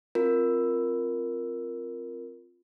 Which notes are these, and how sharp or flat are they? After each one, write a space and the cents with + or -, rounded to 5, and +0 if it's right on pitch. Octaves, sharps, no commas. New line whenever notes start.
C4 +15 F4 +5 A#4 +0